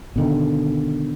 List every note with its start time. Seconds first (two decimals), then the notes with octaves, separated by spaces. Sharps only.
0.16 B2 D3 D#3